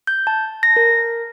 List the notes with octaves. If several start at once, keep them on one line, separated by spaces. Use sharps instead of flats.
G6
A5
A#6
A#4